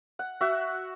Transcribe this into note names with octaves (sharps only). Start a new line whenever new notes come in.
F#5
F#4 E5 F#5